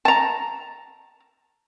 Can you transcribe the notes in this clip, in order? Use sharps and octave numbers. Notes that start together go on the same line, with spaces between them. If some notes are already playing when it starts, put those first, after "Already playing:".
A5 A#5